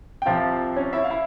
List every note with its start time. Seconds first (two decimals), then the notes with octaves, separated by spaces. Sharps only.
0.22 G5
0.25 C2 C3 F3 C4 F4 F5
0.76 C#4 C#5
0.93 E4 E5
1.04 F5
1.10 E4 E5